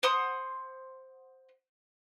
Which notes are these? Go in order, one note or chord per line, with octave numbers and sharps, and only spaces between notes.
C5 F#5 C6 D#6